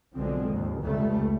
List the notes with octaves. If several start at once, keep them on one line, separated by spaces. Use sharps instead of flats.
B1 D3 F3 G#3 C4
D#2 G#2
F1 C#2 G3 A3